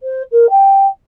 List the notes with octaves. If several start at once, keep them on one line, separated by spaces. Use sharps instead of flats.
C5
A#4
G5